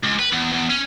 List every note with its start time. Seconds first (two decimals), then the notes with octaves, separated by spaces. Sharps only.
0.03 C#2
0.19 B4
0.32 E2
0.52 E2
0.70 C#4